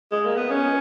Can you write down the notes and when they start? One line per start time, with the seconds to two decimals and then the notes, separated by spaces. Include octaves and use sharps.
0.11 G#3
0.25 A#3
0.37 B3
0.50 C#4